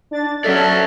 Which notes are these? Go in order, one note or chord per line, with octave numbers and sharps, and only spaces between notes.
D4 A6
F#3 C#4 A4 D5 E5